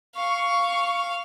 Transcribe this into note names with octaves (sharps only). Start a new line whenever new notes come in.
F5 C#6